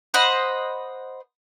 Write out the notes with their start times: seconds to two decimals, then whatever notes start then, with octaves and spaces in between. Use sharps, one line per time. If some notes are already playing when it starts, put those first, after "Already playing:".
0.14 C5 D#5 F#5 B5